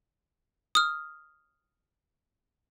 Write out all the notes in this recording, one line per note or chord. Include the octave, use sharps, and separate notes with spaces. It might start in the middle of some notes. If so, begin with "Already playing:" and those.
D#6 F6